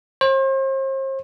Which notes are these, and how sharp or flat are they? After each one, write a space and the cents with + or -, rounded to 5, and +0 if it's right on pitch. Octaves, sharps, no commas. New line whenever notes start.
C5 +40